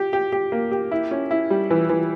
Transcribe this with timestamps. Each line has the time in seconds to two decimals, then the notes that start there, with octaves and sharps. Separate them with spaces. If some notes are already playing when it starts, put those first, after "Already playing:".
Already playing: G4
0.13 G4
0.32 G4
0.52 A#3
0.71 G4
0.91 E4
1.11 C#4
1.31 E4
1.50 G3
1.70 E3
1.89 E3